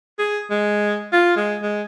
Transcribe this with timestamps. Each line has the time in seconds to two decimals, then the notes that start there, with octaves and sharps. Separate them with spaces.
0.19 G#4
0.50 G#3
1.13 F4
1.37 G#3
1.62 G#3